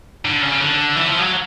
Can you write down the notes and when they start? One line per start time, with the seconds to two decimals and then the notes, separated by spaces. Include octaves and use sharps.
0.25 D3
0.42 C#3
0.61 D3
0.96 E3
1.08 F3
1.19 F#3